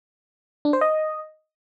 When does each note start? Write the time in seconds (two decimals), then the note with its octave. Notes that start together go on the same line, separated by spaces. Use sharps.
0.65 D4
0.73 C5
0.81 D#5